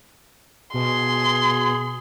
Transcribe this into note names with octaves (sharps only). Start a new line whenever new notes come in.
B2 G#4 C6